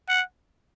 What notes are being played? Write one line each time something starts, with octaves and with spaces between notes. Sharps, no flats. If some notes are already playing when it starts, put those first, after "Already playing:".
F#5